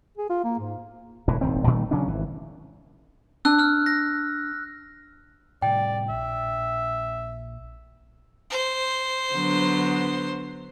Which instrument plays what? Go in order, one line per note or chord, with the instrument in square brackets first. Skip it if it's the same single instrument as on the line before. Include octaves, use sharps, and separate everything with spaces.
[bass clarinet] G#4
F4
A#3
G#2
[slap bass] E1 A2 E3
D#1 G#1 D#3 C4
A#2 D#3 G3 A3
C#3 F#3 C#4 D4
G#1 E3
[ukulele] D4 [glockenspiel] E6 F#6
[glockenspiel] E6 F6
A#6
[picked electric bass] A2 C3 G3 [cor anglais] D5 [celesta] G5
[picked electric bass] A#1 [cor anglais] E5
[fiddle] C5
[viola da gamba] D3 F#3 B3